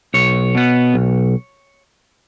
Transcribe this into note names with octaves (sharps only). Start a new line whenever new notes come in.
B1 C#5
B2 B3
B1